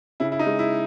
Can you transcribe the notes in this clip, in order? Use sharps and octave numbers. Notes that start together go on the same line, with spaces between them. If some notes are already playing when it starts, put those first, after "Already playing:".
C#3 E4
E4
D#4
G#3
E4